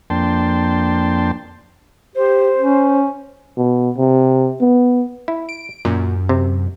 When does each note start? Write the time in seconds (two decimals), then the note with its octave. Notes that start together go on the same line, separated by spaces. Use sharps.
0.10 F2 A#3 D4 G5 A5 C6
2.16 G4 C5
2.56 C#4
3.57 B2
3.98 C3
4.61 B3
5.28 E4
5.49 D7
5.85 F#2 A#2
6.29 C3